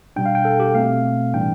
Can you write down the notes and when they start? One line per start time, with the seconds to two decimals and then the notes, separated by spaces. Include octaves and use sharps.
0.16 B2 G3 D4 G5
0.26 F5
0.35 G5
0.45 A4
0.60 G4
0.75 B2 A3 C4 F5
1.34 A2 E3 G3 D4 G5